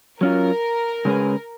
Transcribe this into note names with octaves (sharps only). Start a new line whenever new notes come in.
F#3 C#4 F4 A#4
C#3 G#3 C#4 G#4 B4